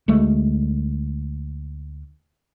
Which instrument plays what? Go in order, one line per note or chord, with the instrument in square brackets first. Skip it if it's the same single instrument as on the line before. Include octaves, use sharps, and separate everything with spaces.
[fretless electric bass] D2 G#3 A3